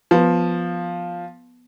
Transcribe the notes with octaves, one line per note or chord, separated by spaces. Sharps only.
F3 B3 B4